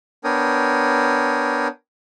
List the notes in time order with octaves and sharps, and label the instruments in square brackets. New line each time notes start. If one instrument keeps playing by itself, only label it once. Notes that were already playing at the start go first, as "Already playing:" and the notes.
[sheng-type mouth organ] B3 D4 A#4 C#5 G5 D#6